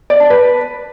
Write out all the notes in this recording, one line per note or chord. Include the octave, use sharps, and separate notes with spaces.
D5
A5
B4